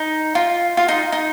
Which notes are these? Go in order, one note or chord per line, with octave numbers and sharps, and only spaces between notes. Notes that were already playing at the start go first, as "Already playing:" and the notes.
Already playing: D#4
F4
F4
D#4
D#4